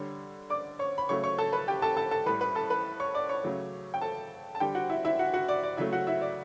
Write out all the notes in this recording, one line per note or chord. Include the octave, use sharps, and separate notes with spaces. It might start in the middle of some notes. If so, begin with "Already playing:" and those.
Already playing: D3 G3 C#5
D5 D6
C#5 C#6
B5
C#3 F#3 A3 C#5 C#6
C#5 C#6
A4 A5
B4 B5
G4 G5
A4 A5
A4 A5
A4 A5
A2 G3 B4 B5
B4 B5
A4 A5
B4 B5
C#5 C#6
D5 D6
C#5 C#6
C#3 F#3 A3
G5
A4 A5
A5
D3 G3 G4 G5
F#4 F#5
E4 E5
E4 E5
F#4 F#5
F#4 F#5
D5
D5
C#3 F#3 A3 E4 E5
F#4 F#5
E4 E5
D5